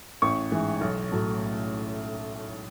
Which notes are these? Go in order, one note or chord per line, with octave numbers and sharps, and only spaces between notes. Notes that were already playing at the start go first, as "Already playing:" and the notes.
A1 C#6
G#2 E3
B1
A2 F#3 A3